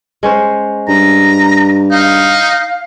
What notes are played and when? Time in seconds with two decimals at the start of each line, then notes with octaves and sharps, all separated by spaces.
0.23 G#3 C#4 C5
0.88 G2 A#5
1.91 D#4 F5